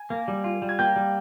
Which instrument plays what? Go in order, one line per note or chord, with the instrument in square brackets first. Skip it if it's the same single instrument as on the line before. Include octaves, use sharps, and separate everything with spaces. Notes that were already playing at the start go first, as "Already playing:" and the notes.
Already playing: [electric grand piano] G#5
[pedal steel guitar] A#3
G3
F4
G3
[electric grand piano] G#6
[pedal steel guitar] A#3 [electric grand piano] G5 G6
[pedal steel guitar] G3